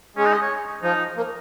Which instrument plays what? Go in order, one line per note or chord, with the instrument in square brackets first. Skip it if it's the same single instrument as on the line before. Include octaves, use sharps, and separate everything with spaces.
[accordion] G#3 [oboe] C#4
[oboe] D#4
D#5
C#5
[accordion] F3 [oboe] D#4
[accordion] A#3